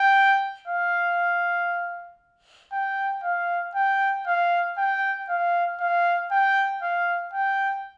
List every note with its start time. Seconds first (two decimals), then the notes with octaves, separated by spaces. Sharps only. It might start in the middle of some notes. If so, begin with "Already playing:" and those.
Already playing: G5
0.68 F5
2.73 G5
3.24 F5
3.75 G5
4.27 F5
4.78 G5
5.30 F5
5.80 F5
6.31 G5
6.82 F5
7.34 G5